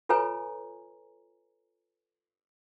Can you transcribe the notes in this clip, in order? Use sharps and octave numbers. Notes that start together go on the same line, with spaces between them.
F4 A4 B4 C#5 G#5 A#5